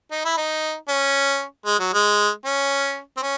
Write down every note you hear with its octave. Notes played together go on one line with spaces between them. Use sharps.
D#4
E4
D#4
C#4
G#3
F#3
G#3
C#4
C4
C#4